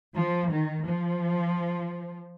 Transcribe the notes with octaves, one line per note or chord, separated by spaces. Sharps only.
F3
D#3
F3